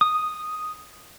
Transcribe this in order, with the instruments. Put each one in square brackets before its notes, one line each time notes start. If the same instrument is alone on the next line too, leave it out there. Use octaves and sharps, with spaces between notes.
[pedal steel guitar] D#6